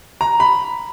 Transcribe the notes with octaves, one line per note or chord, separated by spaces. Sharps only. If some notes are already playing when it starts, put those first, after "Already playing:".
A#5
B5